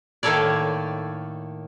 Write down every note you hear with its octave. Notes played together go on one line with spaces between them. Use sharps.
A2 D#3 A#3 A4 C#5 D5